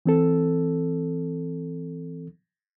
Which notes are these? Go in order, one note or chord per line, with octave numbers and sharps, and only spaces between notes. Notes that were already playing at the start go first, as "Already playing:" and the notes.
E3 C4 A4